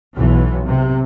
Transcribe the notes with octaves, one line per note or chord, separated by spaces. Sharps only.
B1 E3
C3